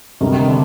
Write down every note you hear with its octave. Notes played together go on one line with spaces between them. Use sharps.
D2 C3 D#3 G3
D#3
D3